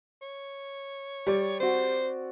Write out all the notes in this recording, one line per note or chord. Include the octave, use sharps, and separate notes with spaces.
C#5
G3 D5 C#6 D6
C4 F#4 C5